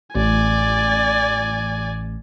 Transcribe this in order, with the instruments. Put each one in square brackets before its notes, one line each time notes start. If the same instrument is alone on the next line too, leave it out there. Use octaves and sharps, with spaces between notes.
[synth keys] A1 [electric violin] D5 G#5